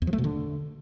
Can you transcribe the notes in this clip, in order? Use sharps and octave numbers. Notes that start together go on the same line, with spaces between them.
E2
F3
A3
B2
D3